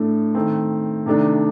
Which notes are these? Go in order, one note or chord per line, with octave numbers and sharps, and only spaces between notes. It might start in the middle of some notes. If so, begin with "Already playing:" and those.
Already playing: A2 A3 D4
D#3 A3 C4
C3 D#3 A3 D4